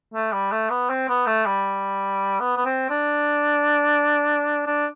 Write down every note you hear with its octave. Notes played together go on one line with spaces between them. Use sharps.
A3
G3
A3
B3
C4
B3
A3
G3
B3
B3
C4
D4
D4